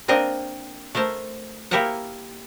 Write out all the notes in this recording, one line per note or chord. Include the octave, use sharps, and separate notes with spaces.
A#3 C4 D4 A#4 D#5
A3 A4 A#4 C5 A5
A#3 E4 G4 A#4 E5 F#5